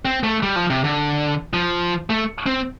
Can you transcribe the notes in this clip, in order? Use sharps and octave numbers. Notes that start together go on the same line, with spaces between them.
C4
A3
G3
F3
C3
D3
F3
A3
C4